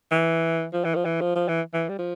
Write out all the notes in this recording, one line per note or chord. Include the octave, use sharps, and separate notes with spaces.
E3
F3
E3
F3
E3
F3
F3
E3
E3
G3
F3